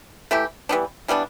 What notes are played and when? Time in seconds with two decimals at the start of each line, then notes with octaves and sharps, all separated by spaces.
0.31 E3 A3 E4 G4
0.69 E3 G3 B3 D4
1.08 E3 G3 B3 D4